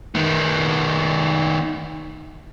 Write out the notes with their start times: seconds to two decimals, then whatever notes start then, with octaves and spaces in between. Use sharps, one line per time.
0.15 D#3 B3